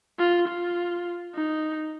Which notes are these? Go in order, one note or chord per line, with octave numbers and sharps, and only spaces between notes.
F4
F4
D#4